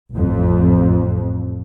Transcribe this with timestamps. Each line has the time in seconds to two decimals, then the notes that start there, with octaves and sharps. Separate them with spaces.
0.11 A1 F2